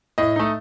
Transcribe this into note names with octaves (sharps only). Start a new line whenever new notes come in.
A2 D#5
A3 D#4